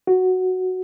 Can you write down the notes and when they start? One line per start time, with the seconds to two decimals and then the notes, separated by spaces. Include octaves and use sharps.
0.07 F#4